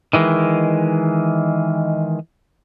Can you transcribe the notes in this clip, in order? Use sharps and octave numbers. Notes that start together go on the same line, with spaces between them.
D#3 E3 G#3